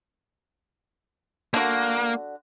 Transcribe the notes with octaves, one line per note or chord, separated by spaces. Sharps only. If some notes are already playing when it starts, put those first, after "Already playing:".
D3 A#3 F#4